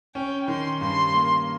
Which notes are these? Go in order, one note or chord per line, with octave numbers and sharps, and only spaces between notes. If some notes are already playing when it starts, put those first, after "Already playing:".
C#4 G5
D#3 C6
G2 C6
A#3